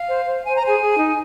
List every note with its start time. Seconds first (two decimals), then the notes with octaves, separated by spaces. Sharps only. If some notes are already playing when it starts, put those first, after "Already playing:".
Already playing: F5
0.09 C5
0.27 C5
0.46 C5 G#5
0.56 A#5
0.62 G#4 C5 G#5
0.80 G#4
0.98 D#4